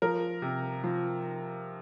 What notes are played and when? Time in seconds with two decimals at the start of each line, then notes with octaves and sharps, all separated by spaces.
0.02 F3 A#4
0.42 C3
0.84 F3